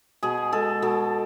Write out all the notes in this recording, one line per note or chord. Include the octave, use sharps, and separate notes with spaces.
B2 G#4
G#3 A4
B2 A4